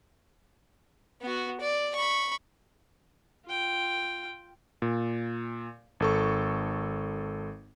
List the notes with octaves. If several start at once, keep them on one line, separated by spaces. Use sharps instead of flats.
B3 F#4
D5
B5 C#6
F4 G5
A#2
G#1 A4 C#6